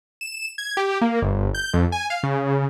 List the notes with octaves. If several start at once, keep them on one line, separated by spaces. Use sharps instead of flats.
E7
G#6
G4
A#3
G1
G6
F2
G#5
F5
C#3